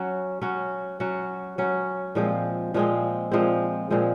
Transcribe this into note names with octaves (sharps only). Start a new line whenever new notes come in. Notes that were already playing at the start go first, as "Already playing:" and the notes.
Already playing: F#3 C#4 F#4
F#3 C#4 F#4
F#3 C#4 F#4
F#3 C#4 F#4
A#2 F3 G#3 C4
A#2 F3 G#3 C4
A#2 F3 G#3 C4
A#2 F3 G#3 C4